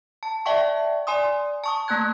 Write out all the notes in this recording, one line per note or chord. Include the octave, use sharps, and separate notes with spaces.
A5
D5 E5 F#5 G5 A5 C#6
D5 G#5 C6 D#6
A5 C#6 D#6
A3 A#3 A5 F#6 G#6